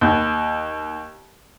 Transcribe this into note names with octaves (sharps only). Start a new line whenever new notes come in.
D#2